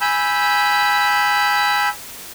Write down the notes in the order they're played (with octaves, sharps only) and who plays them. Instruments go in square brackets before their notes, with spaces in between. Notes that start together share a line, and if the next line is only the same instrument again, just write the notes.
[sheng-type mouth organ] G#5 B5 E6 G6